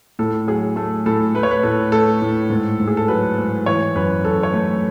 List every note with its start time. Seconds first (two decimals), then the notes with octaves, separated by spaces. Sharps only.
0.19 A2 A4
0.47 F#3 G#4
0.76 A3 A4
1.06 A2 A4
1.35 A3 B4
1.43 C#5
1.51 B4
1.63 A2 A4
1.92 A3 A4
2.22 A2
2.50 G#2
2.80 G#2
2.87 G#4
2.97 A4
3.08 F#3 B4
3.38 G#2
3.66 E3 C#5
3.95 F#2 B4
4.25 F#2 A4
4.43 C#5
4.53 A3